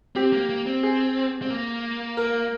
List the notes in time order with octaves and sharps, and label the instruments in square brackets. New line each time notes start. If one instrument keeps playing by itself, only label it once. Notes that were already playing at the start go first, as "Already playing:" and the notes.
[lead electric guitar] C4 [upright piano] G4
[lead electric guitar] A#3
A#3
C4
[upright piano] G#4
[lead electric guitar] C4
A#3
[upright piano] A#4